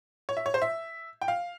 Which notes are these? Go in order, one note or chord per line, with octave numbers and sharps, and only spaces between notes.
C#5
E5
C#5
C5
E5
G5
F5